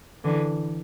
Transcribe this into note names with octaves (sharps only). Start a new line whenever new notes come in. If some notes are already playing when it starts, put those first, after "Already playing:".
D3 E3